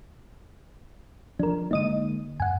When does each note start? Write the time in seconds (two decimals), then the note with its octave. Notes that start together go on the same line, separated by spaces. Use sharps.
1.39 F3 D4 A#4
1.71 D3 G#3 A#3 D#4 D#5 D#7
2.40 F#2 F#5 G#5